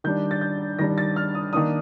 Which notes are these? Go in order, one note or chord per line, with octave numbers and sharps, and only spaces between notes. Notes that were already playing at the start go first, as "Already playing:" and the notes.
D#3 G3 D4 G6
A6
G6
D#3 G3 D4 A#6
A6
F6
D#6
D#3 A#3 D4 D#6